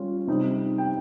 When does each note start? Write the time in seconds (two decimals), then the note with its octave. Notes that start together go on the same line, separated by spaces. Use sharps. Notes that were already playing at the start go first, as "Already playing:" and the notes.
Already playing: G3 C#4 F4
0.27 C3 G3 C4 D#4
0.78 G5